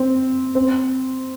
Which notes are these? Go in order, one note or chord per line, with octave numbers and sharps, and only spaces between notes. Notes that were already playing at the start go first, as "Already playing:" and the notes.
Already playing: C4
C4